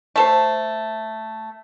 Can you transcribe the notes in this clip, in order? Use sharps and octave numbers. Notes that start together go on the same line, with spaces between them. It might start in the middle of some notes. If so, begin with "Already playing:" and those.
A3 A4 C5